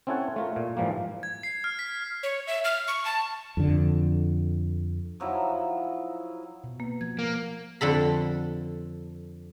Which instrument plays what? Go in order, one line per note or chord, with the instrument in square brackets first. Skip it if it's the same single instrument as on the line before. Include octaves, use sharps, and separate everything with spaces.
[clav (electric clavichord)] C4 C#4 E4 A4 C#5 F#5
A3 F4 A#4
A#2
G#2 E3 F3 G3 A#3
[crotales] G#6
C7
F6
B6
[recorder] C#5
E5
F6
C#6
A5
[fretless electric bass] F2 D3
[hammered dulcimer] F3 F#3 D#4 E4
[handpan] B2
[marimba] A#3 [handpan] B3
[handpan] F3 [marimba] G#6
[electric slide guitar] A#3
[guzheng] F2 D3 A4 B5